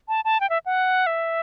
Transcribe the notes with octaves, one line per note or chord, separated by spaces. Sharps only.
A5
A5
G5
E5
F#5
E5